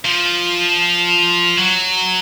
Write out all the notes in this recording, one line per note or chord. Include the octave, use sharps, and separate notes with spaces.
F3
F#3